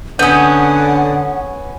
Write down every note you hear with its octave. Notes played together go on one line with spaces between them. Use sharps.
D3 B3 C#4 F#5 D#6 G6